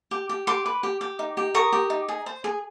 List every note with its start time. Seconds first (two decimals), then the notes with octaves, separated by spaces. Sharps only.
0.11 G4
0.29 G4
0.47 G4 C6 D6
0.66 B4
0.83 G4
1.01 G4
1.19 D#4
1.37 G4
1.54 A#4 C#6 D#6
1.73 G4
1.90 D#4
2.09 G#4
2.26 C5
2.44 G#4